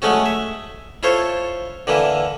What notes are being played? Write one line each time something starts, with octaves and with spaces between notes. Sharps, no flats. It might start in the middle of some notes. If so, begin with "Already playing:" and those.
F#3 G#3 A3 C#4 F#4
E5
E4 F4 A4 C5 C#5
D3 E3 A#3 E4